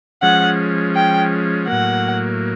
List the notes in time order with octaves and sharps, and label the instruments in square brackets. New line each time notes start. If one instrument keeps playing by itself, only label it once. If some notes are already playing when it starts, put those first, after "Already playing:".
[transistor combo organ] F3 G#3 C#4 [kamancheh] F#5
[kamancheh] G5
[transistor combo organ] A2 F#3 A#3 [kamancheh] F#5